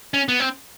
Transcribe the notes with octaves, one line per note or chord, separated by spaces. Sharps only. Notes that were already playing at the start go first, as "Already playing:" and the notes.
C#4
B3
C4